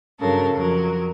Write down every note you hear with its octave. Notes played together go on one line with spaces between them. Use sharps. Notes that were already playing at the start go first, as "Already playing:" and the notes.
G2 C#3 F#3 A4 A#4
F2 F#3 A#4